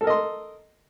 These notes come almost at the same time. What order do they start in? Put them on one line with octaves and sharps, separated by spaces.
A4 A#4 D#5 C6